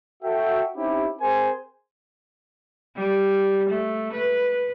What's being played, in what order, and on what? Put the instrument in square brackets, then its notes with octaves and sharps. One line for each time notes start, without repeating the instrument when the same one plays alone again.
[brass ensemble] F#4 A4 E5 G5
C4 C#4 D#4 E4 G4
C4 G#4 A#4 C5 G#5
[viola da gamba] G3
A3
B4